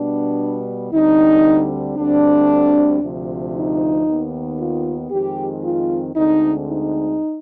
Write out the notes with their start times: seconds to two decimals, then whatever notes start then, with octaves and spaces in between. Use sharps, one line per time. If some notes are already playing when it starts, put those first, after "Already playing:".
Already playing: B2 G3 B3 D4
0.92 D2 D3 G3 C4 D#4
1.97 D2 D3 G3 C4 D4
3.01 D2 C3 F3
3.54 D#4
4.06 D#2 D#3 B3
4.58 F4
5.11 F2 D#3 G#3 C4 G4
5.63 F4
6.15 D2 D3 G#3 C4 D#4
6.68 D#4